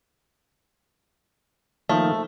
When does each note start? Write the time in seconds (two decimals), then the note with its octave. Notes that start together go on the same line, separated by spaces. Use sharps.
1.89 D#3 F3 A3 A#3